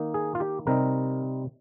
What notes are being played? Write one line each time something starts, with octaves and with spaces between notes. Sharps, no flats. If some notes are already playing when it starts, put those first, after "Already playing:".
Already playing: D#3 A#3 D#4
G#4
F4
G4
C3 G3 C4 D#4 A#4